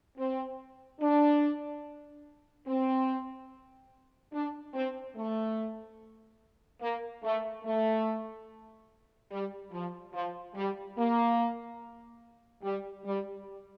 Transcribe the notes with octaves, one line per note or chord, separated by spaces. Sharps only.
C4
D4
C4
D4
C4
A3
A#3
A3
A3
G3
F3
F3
G3
A#3
G3
G3